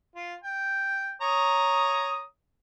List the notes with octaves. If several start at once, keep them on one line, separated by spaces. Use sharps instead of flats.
F4
G5
C#5 A#5 D#6